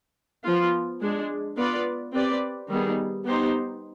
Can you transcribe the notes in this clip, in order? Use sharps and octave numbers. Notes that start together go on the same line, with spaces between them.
F3 B3 F4
G#3 D4 G#4
B3 F4 B4 D5
C4 G4 B4 D5
D#3 G3 B3 D#4 G#4
B3 D#4 G4 C5